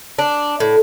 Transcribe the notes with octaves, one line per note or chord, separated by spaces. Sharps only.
D4
A2